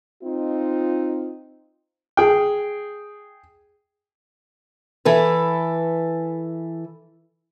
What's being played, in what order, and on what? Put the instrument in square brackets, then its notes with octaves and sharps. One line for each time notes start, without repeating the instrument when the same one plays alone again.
[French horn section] C4 D#4 F4
[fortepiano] G#4 G5
[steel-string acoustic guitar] E3 A4 B4